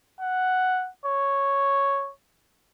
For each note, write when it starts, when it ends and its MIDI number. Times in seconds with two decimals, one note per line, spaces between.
0.21 0.90 78
1.05 2.12 73